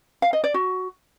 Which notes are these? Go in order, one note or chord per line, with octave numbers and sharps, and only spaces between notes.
F5
D#5
D5
F#4